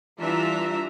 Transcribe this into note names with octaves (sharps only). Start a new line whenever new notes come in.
E3 G3 D4 F4 E5 A#5